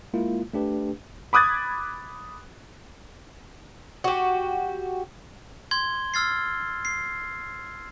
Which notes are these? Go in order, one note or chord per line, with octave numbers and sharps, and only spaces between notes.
G#3 A#3 E4 F4
A3 D4 G4 B4
B5 D6 D#6 F#6 G#6 A6
F#4 G4
C6 G#6 G7
E6 F6 A6 C7
C7